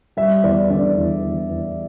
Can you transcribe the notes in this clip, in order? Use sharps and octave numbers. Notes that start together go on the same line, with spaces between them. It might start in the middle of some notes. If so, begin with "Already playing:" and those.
G3 E5
E2 D5
D3 D5
E2
E2
E2